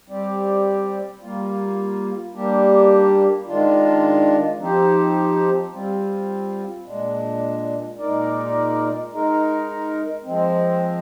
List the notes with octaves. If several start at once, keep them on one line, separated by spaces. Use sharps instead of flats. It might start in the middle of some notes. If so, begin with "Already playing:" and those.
G3 C4 G4 D5
G3 A#3 F4
G3 A#3 D4 G4
D#3 G#3 D4 F4
F3 C4 D#4 G4 C5
G3 C4 F4
A#2 G#3 D4
A#2 G#3 D#4 A#4 D5
G#3 D#4 A#4
F3 G#3 C4